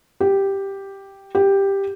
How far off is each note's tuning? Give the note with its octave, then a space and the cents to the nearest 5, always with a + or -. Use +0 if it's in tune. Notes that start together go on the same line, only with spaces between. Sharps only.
G4 +0
G4 +5